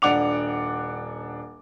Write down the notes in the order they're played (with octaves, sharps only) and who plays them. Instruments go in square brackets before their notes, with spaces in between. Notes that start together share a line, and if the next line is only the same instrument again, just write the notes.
[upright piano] D#1 D4 F#5 D6 F7